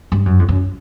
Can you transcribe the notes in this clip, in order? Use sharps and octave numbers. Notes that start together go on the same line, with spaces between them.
G2
F#2
F2
F#2